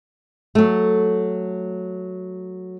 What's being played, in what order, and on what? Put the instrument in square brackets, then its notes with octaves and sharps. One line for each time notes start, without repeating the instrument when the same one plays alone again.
[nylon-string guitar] F#3 A3